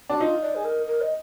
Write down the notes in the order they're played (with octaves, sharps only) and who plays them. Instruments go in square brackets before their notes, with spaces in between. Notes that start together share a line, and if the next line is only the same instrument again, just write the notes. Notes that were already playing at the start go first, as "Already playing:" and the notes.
[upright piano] D4 [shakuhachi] F#4
[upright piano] D#4 [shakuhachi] F4
[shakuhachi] D5
G#4
A#4
A#4
D#5